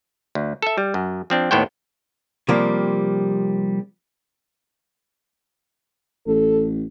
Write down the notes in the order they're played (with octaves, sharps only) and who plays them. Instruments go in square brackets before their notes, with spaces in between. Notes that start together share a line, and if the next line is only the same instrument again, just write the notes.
[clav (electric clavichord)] D2
A4 E5
G3
F#2
F3 C4 D4
D#2 A2 B3 C5 C#5 G5
[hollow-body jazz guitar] C3 F3 G3 A#3
[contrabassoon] A1 [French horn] A4